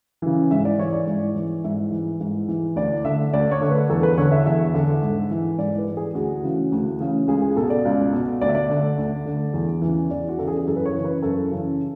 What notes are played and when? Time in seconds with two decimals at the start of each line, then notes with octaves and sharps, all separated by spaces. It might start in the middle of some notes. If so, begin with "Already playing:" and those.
0.22 C#3 E3
0.51 G#2 E5
0.65 D5
0.79 E3 C#5
0.93 D5
1.07 G#2
1.35 E3
1.64 G#2 E5
1.91 E3
2.20 G#2
2.48 E3
2.76 D2 D5
3.05 D3 E5
3.33 D2 D5
3.51 C#5
3.61 D3
3.71 B4
3.90 E2 A4
4.03 B4
4.17 D3 C#5
4.32 E5
4.46 E2 E5
4.74 D3
5.02 G#2
5.31 E3
5.58 G#2 D5
5.78 B4
5.87 E3
5.97 G#4
6.15 D2 F#4
6.43 C#3 E3
6.72 D2
7.00 C#3 E3
7.27 C#2 G#4
7.42 G#4
7.56 B2 A4
7.70 D5
7.85 C#2
8.13 B2
8.41 D2 D5
8.48 E5
8.55 D5
8.70 D3
8.98 D2
9.26 D3
9.54 E2
9.81 C#3 E3
10.10 E2 D5
10.29 F#4
10.38 C#3 E3 A4
10.47 G#4
10.59 G#4
10.66 F#2 A4
10.76 B4
10.86 C#5
10.94 C#3 E3
11.04 B4
11.22 F#2 A4
11.51 C#3 E3